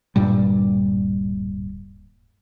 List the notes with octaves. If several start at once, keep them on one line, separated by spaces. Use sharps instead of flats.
D1 G2 A#2 G3